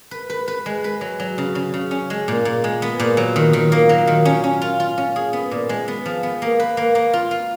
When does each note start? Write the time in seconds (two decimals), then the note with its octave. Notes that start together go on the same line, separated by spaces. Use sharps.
0.11 B4
0.30 B4
0.48 B4
0.66 G#3
0.84 B4
1.01 F#3
1.20 F#3
1.38 C#3
1.55 C#3
1.74 C#3
1.91 C#4
2.10 G#3
2.28 A#2
2.45 A#2
2.64 G#3
2.82 B3
3.00 A#2
3.17 F#3
3.36 D#3
3.53 D#3
3.72 A#3
3.89 F#3
4.07 D#3
4.25 C#4
4.44 C#4
4.62 F4
4.80 F4
4.98 C#4
5.16 G#4
5.33 B3
5.51 A#2
5.69 G#3
5.88 B3
6.06 F3
6.23 B3
6.42 A#3
6.60 B4
6.77 A#3
6.95 A#3
7.13 F4
7.31 F4